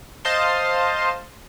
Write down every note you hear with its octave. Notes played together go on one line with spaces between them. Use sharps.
C5 D#5 F5 A5 C6